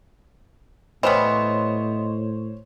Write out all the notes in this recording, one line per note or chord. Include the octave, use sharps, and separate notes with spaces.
A2 E3 G3 B3 C5 C#5 D#5 C6